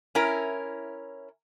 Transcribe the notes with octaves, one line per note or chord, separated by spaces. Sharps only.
C#4 E4 A#4